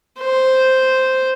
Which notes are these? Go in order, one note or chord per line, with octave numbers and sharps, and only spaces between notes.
C5